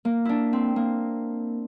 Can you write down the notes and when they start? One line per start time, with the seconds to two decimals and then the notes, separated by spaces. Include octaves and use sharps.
0.05 A#3
0.25 D4 E4
0.53 C4
0.76 A#3